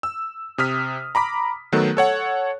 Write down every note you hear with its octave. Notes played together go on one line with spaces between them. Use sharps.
E6
C3 D#6 F6 B6
A#5 B5 D6 B6
D#3 F#3 A3 B3 A4 F#6
A4 C#5 F#5